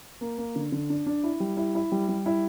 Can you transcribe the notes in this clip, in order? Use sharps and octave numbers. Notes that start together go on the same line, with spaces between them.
A#3
A#3
D3
D3
D4
D4
E4
G3
E4
E4
G3
G3
E4